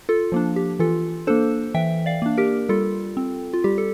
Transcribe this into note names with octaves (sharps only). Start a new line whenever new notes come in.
F4 A4
F3 A#3 D4
G4
E3 F4 A4
A#3 D4 A4 C5
E3 E5 G5
D5 F5
A#3 D4
G4 A#4
G3 F4 A4
C4
F4
G3 G4
A4